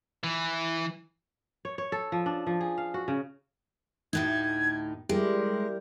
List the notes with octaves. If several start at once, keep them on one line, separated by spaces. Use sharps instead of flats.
E3
C#5
C#5
A4
F3
D4
F3
G#4
F5
F#4
C#3
D2 A2 D#4 G#6
G3 G#3 E4 G4 A#4